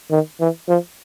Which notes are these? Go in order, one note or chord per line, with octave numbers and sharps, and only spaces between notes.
D#3
E3
F3